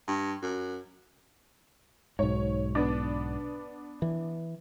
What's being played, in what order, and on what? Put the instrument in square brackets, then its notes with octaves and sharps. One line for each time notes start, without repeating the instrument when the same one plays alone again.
[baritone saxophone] G2
F#2
[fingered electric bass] B1 G#2 [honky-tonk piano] C#5
[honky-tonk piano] B3 D4
[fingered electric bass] E3